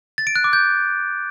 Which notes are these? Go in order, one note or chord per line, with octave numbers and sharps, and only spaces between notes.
A6
D7
F#6
D6
G6